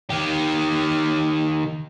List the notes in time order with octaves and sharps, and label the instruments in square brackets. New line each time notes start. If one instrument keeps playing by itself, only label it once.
[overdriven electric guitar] D#3 G4